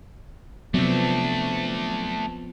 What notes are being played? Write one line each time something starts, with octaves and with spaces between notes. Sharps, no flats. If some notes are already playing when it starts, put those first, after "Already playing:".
C3 F3 F#3 A3 B3 C4 D4